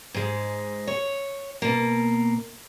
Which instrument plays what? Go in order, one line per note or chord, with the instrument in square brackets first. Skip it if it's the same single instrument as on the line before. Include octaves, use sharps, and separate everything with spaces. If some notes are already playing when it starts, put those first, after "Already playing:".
[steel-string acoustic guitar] G#2 G#3
C#5
B2 A#3